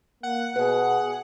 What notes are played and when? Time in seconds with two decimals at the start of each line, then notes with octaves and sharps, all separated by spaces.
0.23 A#3 F#5
0.56 B2 G#4 B4